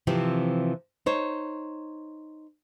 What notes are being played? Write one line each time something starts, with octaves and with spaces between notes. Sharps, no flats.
C3 E3 F3 C4
D#4 C5 C#5